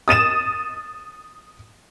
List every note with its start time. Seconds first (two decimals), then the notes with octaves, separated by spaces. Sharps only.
0.08 D#6 A6 D#7 E7